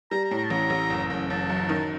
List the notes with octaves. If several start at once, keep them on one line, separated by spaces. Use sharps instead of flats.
G3 A#5
A#5
A2
A#5
A5
A1 A#5
A1
F#1
F#1
F#1 A5
F#2
D#3